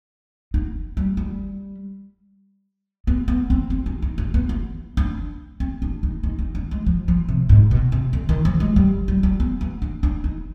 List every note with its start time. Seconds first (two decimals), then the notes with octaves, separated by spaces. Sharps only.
0.54 D#4
0.97 G3
1.17 G3
3.07 B3
3.28 B3
3.50 C4
3.70 C4
3.86 D4
4.02 D#4
4.18 D4
4.34 B3
4.49 B3
4.97 D4
5.60 C4
5.82 D4
6.03 D#4
6.23 D#4
6.39 D#4
6.55 D4
6.71 G#3
6.86 F3
7.08 F3
7.29 C3
7.49 G#2
7.71 B2
7.92 C3
8.13 D3
8.29 D#3
8.45 F3
8.60 G#3
8.76 G3
9.08 G3
9.23 G3
9.40 B3
9.61 B3
9.82 D4
10.03 D4
10.24 D#4